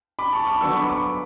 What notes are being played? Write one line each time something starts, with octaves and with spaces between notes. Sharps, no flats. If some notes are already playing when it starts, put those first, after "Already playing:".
B5 D6
A5 C#6
B5 D6
D3 F#3 B3 D4 C#6 E6
B5 D6
C#6
B5 D6